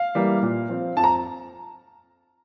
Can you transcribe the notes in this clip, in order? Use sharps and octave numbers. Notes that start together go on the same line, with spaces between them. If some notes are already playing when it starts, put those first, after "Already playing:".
Already playing: F5
E3 G3 A#3
A#2
F3 C4
F2 A5
A#5